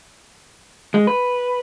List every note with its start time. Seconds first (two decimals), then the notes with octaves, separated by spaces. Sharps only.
0.94 G#3
1.07 B4